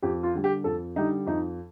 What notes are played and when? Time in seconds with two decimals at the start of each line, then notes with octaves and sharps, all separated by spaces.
0.02 F2 G4
0.23 F4
0.34 D3 G3
0.44 G4
0.64 F2 A4
0.96 D3 G3 D#4
1.26 F2 D#4